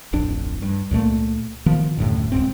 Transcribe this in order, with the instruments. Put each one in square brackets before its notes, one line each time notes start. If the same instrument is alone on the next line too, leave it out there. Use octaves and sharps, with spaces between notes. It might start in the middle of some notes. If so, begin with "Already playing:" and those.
[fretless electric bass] D1 A1 F2 D4
G2
C#2 A#2 A3 A#3
D#3 F3 B3
D#1 F#2 A2 D3
D1 C#2 G#2 C4